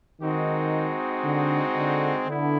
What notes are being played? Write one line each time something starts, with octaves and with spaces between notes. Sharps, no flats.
D#3 G#3 C4 D#4 F#4
D3
D3
D3 B3 E4